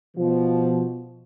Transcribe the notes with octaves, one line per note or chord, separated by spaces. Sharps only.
B2 F3